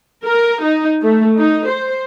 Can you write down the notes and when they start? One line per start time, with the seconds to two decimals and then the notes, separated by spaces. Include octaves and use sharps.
0.25 A#4
0.63 D#4
1.00 A3
1.38 D#4
1.69 C5